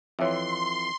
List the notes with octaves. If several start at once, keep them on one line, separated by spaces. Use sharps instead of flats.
F2 E3 C#5 E5 C6